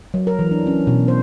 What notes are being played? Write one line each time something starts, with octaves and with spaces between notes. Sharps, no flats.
F#3
A#4
E3
D4
C#4
B2
C5